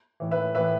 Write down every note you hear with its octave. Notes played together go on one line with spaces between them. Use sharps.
A2 E3
B4 E5
A2 E3 B4 E5